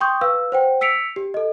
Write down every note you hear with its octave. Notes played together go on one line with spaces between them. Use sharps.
G5 C6 C#6 D#6 G6
B4 F5 E6
C5 F#5 G5
E6 B6 C#7 D7 F7
G4
A4 D#5